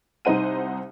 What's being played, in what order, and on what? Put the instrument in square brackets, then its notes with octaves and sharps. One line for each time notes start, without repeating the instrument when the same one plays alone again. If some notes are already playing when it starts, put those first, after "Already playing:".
[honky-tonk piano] C2 D#4 C5 F#5 D#7